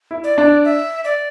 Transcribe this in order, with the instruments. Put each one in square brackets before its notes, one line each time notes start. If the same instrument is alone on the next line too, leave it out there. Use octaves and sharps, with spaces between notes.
[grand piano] E4
[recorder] D5
[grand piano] D4
[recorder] E5
D5